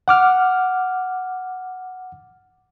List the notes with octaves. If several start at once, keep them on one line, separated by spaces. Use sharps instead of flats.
F#5 D6 F6